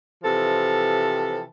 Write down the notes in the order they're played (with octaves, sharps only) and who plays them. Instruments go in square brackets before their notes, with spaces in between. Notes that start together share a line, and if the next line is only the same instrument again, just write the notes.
[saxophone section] C3 E3 F3 A4